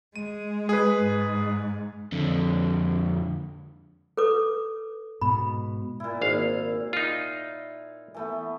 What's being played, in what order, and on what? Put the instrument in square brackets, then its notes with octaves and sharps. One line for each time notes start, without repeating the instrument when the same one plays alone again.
[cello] G#3 [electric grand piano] D#7
[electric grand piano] G#4 B4
[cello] G#2
[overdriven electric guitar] F2 D3
[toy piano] A4 B4 D6
[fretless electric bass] G#2 B2 [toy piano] B5
[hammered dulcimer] A#2 E4
[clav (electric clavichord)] G#1 F5
D#4 F4
[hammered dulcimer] E3 A3 B3